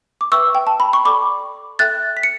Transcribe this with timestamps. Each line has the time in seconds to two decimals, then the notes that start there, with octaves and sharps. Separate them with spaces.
0.21 D6
0.32 B4 E5 G5 C#6 E6
0.55 G5
0.67 A5
0.80 B5
0.93 C#6
1.05 A4 D5 G5 B5 D6
1.79 A4 E5 G5 F#6 A6
2.17 B6
2.23 C#7